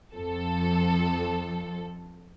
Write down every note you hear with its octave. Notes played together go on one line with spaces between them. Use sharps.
F2 F3 A4